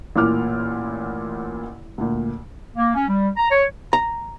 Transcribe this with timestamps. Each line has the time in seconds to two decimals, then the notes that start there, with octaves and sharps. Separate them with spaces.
0.16 A1 A#2 D6 F6
1.98 D2 A#2
2.76 A#3
2.95 C#4
3.08 G3
3.37 A#5
3.51 C#5
3.93 A#5